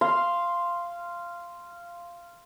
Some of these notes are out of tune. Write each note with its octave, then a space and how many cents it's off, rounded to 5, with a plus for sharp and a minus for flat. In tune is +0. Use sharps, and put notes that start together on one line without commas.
F5 -15 C6 +0